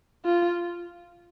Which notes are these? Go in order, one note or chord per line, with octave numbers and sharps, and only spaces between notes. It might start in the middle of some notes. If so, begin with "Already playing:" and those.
F4